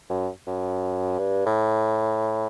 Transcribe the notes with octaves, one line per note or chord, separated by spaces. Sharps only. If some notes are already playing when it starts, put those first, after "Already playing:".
F#2
F#2
G2
A2